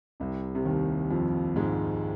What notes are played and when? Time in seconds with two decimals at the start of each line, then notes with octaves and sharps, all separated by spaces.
0.20 C2 C3
0.55 C3
0.65 D#2 D#3
1.11 F2 F3
1.56 G#2 G#3